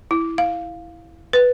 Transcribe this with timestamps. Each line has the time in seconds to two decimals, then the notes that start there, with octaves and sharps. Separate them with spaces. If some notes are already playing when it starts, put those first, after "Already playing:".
0.11 E4
0.38 F5
1.33 B4